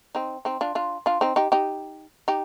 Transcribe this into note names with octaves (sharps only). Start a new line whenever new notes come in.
C4 D#4
C4 D#4
D4 F4
D4 F4
D4 F4
C4 D#4
D#4 G4
D#4 G4
D#4 G4